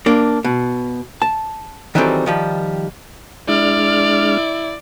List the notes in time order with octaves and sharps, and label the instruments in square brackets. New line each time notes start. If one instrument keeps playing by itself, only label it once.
[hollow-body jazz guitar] A#3 D4
B2
A5
D#3 E3 F#3 G3 C4 A4
D#3 F3 G3
[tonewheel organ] G#3 D4 F6 [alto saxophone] E4 [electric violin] D5